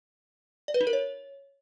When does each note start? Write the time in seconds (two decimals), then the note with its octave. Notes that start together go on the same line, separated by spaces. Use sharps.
0.68 D5
0.74 B4
0.81 D#4
0.87 A#4
0.93 C#5